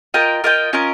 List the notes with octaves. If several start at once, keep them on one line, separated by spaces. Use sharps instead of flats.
F4 A#4 D#5 G5
F4 A#4 D#5 G5
C#4 F4 A#4 D#5